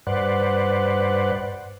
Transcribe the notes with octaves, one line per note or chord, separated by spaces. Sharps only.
G2 B4 C5 D5 F#5